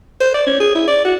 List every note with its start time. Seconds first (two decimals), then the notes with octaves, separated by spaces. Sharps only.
0.20 C5
0.34 D5
0.47 C#4
0.60 G#4
0.75 E4
0.88 D5
1.05 F#4